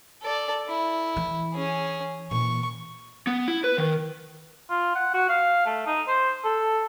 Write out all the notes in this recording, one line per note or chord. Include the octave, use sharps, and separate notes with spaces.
A4 D5
E4
E3
C#4 G#4
A#2 E3 C#6
B3
E4
B4
D#3
F4
F#5
F#4
F5
A3
D#4
C5
A4